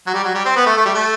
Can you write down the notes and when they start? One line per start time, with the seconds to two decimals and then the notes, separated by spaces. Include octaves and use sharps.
0.07 F#3
0.14 G3
0.24 F#3
0.34 G3
0.45 C4
0.56 B3
0.66 A3
0.77 A3
0.85 G3
0.94 A3